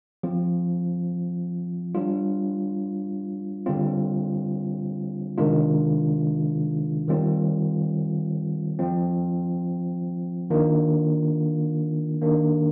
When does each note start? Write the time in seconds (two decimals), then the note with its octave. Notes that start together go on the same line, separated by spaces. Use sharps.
0.23 F3 C4 F4
1.95 G3 D4 F4
3.66 D3 G3 C4 F4
5.38 C3 D#3 G#3 D4 F4
7.08 D#3 G3 C4 F4
8.79 F3 C4 F4
10.50 D#3 A#3 D4 F4
12.22 D#3 A#3 D4